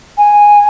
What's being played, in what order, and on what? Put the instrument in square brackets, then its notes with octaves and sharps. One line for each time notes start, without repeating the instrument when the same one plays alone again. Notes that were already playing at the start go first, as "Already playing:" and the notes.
[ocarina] G#5